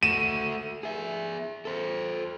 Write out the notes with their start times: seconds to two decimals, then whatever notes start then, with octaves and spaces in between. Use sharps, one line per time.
0.03 A3 F#4 D#7 E7
0.83 G#4 E5
1.65 A4 C5